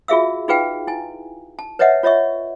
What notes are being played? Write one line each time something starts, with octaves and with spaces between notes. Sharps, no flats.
F4 F#4 G#4 E5 F5 E6
D#4 F4 G#4 B4 F5 G5
E4 G#5
A5
B4 C#5 D#5 E5 F#5
F4 C#5 D#5 E5 C#6